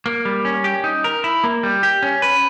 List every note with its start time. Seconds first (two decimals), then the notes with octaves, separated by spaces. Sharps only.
0.06 A#3
0.25 G3
0.45 C#4
0.64 G4
0.84 D#4
1.04 A#4
1.24 E4
1.44 A#3
1.63 G3
1.83 G4
2.03 C#4
2.22 B4